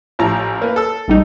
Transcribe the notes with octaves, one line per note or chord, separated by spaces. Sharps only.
A1 F3 A#5
A#3 B4
A4 E6
A#1 G3 D#4